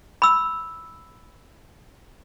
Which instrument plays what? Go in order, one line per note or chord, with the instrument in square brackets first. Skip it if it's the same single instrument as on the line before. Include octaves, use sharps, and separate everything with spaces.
[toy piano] B5 E6